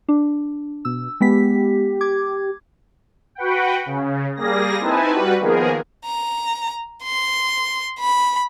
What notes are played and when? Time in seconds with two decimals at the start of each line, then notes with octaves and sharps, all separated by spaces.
0.09 D4
0.85 B2 E6
1.21 G#3 B3 G4 B6
2.01 D6 G#6
3.35 F#4 B4 F#5 G5
3.86 C#3
4.36 G3 A#3 G#4 A#6
4.80 C4 D#4 E4 B4 G#5 A5
5.11 G3 F#4 B4
5.40 D#3 F3 A#3 B3 G#4 A#4
6.06 A#5
7.03 C6
7.99 B5